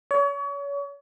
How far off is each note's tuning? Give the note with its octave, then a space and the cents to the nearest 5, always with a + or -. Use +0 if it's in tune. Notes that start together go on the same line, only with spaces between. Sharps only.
C#5 +35